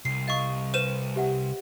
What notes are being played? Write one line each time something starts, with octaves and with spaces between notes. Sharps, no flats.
C2 C7
D#5 F5 C#6 D#6
B4 C5 D#7 E7
G4 E5 F#5